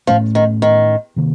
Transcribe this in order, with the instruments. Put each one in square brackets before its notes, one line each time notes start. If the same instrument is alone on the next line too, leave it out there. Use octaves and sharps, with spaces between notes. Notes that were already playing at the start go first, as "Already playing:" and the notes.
[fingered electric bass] A2 A3 C#4 [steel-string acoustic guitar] F3
[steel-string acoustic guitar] D#3
D#3
[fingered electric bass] C3 D#3 A#3